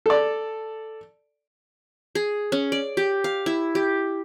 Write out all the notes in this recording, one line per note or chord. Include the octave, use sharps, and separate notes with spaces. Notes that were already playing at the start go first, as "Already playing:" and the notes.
A4 D5
G#4
C#4
D5
G4
F5
E4
G4